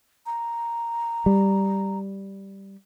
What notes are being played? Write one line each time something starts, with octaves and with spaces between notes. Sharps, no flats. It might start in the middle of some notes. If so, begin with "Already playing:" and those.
A#5
G3